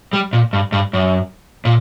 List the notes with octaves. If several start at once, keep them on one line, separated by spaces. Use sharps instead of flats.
G3
A#2
G2
G2
F#2
A#2